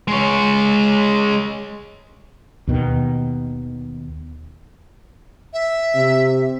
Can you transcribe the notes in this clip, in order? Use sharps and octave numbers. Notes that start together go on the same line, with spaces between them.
G#3 C#5
D#2 B2 D#3
E5
C3